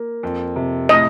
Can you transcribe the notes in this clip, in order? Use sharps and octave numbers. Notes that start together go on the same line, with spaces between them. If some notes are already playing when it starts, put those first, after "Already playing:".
Already playing: A#3
F2
C3
A2 D#5